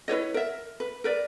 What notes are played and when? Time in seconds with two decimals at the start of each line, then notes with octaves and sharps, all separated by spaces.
0.08 E4 B4 C#5 D#5
0.34 A#4 E5
0.80 B4
1.04 A#4 B4 D5